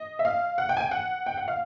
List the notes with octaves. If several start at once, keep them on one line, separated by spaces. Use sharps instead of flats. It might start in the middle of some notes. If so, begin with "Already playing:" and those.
Already playing: D#5
E5
F5
F#5
G5
G#5
G5
F#5
G5
F#5
F5